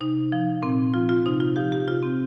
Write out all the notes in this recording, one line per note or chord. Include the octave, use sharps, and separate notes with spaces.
C3 D#4
F3
A#2 C4
F3 F4
F4
C3 D#4
F4
F3 G4
G4
C3 F4
C4